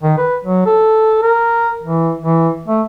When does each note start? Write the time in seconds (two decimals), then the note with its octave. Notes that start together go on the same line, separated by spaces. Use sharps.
0.03 D#3
0.18 B4
0.44 F#3
0.66 A4
1.22 A#4
1.82 E3
2.20 E3
2.68 A3